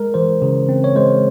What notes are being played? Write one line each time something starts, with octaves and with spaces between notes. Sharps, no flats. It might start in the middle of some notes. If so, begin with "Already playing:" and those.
Already playing: G#3 A#4
E3 C5
C#3
C4
C#5
G#3 C5